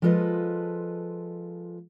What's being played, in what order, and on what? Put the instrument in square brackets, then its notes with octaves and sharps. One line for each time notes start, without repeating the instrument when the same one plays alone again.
[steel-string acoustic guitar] F3 G#3 F4 A4 B4 D#5